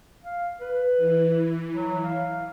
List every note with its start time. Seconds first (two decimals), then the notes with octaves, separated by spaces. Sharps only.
0.24 F5
0.61 B4
0.97 E3
1.71 F#3
2.03 F5